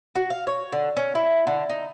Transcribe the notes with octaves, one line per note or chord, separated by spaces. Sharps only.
F#4
F5
C#5
D3
C#4
E4
D3
D#4